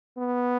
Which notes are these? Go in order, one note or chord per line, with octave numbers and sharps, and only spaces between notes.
B3